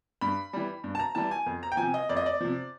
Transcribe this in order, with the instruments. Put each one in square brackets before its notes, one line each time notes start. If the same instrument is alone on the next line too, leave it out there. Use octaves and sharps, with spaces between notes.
[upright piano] G2 B5
E3 G3
G2
A5
A#5
E3 G3 A5
G#5
F2
A#5
G5
C3 F3 G#5
D#5
F2 D5
D#5
D5
C3 F3